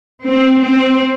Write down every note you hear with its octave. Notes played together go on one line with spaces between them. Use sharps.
C4
C4